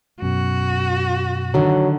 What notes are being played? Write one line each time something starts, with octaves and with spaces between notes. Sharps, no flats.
F#2 B2 F#4
D3 D#3 F#3